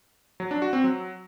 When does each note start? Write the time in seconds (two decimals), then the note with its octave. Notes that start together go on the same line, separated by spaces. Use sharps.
0.40 F#3
0.51 D4
0.62 F#4
0.73 C4
0.84 F#3